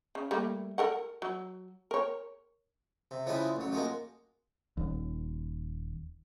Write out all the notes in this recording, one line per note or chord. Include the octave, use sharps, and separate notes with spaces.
C#3
G3 A3 A#3
A4 A#4 F#5
F#3
A#4 C#5
C3
C#3 F3 G3 G#3 E4 B4
A1 F#3
F3 F#3 G#3 A#3
D#1 D#2